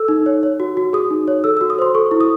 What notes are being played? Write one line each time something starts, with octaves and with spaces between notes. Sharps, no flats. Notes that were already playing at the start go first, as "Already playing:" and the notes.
Already playing: A4 E6
D#4
C#5
C#5
F#4
F#4
G#4 D#6
D#4
C#5
A4 E6
F#4 E6
D#6
C5 C6
A4 C#6
E4
D#6